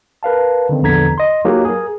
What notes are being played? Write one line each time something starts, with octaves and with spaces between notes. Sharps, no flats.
A#4 B4 F5 A5
D3 D#3 C4
A#1 E2 D3 A#5 G#6 B6
D#5 C6
F#3 A#3 D#4 F4 G4 G#4
G#4 A#4